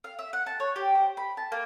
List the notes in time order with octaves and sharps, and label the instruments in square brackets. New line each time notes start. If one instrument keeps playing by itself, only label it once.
[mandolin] F5
E5
F#5
A5
C#5
G4
C5
B5
A5
A#3